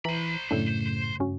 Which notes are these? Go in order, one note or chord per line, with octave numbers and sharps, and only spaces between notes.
E3 C5 A#5 B5
F#2 A2 C#3 A3 D4 A4
G2 C#4 F#4